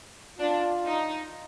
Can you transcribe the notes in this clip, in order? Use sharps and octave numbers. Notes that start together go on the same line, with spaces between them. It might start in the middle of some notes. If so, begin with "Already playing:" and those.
D4 F4
D#4